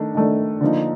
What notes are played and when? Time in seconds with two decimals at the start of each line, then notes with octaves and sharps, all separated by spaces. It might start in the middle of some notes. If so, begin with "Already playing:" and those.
Already playing: D#3 A3 D4
0.15 D#3 A3 D4
0.61 D3 F3 A#3 D#4